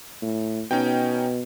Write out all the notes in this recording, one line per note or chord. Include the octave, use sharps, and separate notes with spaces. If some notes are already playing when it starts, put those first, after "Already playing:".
A2
B2 C#4 D#4 G5